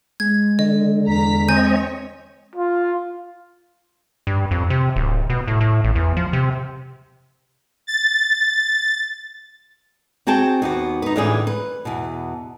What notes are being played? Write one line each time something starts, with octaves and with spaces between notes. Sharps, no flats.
G#3 G#6
D3 D#5
E2 A#5 B6
C4 C#5 D#5 G#5 G6
F4
G2
F2
C3
D1
B2
A2
A2
A1
E2
F3
C3
A6
C4 F#4 G#4 G5 A5
D#2 B3 F#4
D#4 B4
A2 D3 E3 C#4 F4 G#4
B4
E2 B2